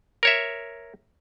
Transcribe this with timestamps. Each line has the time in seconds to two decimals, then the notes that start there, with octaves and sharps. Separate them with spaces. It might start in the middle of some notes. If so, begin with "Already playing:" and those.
0.23 A#4 C#5 E5